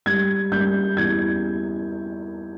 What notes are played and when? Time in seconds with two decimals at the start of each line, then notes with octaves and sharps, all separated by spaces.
0.06 G3 G#6
0.52 G3 G6
0.97 E2 G#6